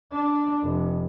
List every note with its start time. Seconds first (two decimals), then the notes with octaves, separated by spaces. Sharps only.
0.12 D4
0.64 F1